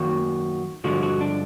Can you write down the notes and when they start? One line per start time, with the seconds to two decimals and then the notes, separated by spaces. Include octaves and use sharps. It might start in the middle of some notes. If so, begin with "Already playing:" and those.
Already playing: F#2 D#3 F#3 A#3 F#4
0.84 G2 D3 F3 G#3 F#4
1.03 F#4
1.21 D4